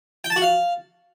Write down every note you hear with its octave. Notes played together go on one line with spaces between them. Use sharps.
G5
A5
F#4
F5